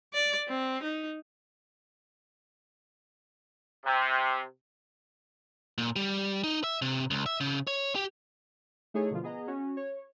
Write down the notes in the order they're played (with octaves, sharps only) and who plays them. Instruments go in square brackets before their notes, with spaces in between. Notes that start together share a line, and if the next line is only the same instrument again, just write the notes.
[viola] D5
C4
D#4
[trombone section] C3
[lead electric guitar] A#2
G3
D#4
E5
C3
C#2
E5
C#3
C#5
G4
[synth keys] A3 D#4 E4 G#4 C#5
B2 D3 F3 F4
B3 G#4 D#5 A#5
C#4 F#4
C#5